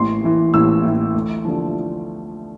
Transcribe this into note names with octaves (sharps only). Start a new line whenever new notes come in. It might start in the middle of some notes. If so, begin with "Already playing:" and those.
Already playing: A1 C6
A2 E3
A1 E6
A2 E3
D2
D3 F3